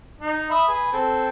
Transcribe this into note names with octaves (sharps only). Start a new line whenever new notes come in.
D#4
E5 B5 D#6
G#4 B4
C4 A4